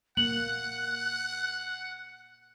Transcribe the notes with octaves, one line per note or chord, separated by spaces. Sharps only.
A#3 F#5 F#6 F#7